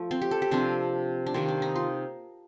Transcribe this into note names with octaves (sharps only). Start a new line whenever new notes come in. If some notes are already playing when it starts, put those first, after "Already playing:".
Already playing: F3 A3
C4
G4
A4
G4
C3 F3 C4 D4
D4
C3 D#3 A#3 C4
D4
D#4
F4